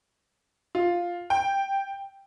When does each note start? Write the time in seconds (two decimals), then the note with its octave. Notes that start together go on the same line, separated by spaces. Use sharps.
0.75 F4
1.30 G5